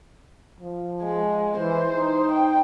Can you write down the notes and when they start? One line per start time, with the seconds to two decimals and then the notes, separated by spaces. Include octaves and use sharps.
0.60 F3
1.02 G#3
1.58 E3 C5
1.93 D#4
2.32 G5